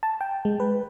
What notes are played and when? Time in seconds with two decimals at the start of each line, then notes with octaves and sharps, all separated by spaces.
0.03 A5
0.21 G5
0.45 G#3
0.60 B4